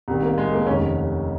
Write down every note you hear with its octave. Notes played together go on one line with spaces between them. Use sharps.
C2 C3 D#3
A#3
G#3
A#3
F1 D#2 D#3 C#4